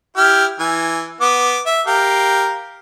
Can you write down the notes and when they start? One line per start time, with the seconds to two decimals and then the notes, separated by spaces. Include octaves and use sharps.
0.17 E4 G4 F6
0.59 E3 G#5
1.21 B3 D6
1.66 E5
1.87 G4 A#4 F5